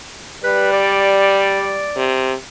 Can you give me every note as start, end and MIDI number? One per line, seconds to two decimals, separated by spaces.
0.44 1.85 55
0.44 0.70 71
0.72 2.15 74
1.96 2.34 48